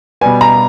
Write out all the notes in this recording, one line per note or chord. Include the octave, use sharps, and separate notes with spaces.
B2 G3 B3 G#5
A#5